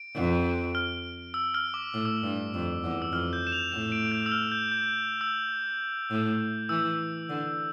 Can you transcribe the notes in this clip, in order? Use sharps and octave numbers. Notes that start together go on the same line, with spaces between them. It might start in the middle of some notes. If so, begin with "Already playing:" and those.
Already playing: D7
F2
F6
E6
F6
D6
A2 F6
E6
F6
G2
F2
E2
E6
F2 F6
G6
E7
F7
A2 E7
D7
G6
E6
F6
G6
G6
E6
A2
E3 E6
D3